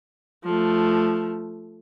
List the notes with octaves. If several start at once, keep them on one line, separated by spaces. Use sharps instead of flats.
F3 A3